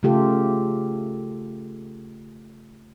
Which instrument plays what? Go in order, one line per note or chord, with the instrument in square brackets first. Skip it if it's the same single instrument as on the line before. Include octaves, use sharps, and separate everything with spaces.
[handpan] C#3 A3 F4 G4 A4